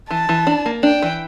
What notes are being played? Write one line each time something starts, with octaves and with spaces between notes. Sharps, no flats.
E3 A5
E3
D4
A#3
D4 G5
E3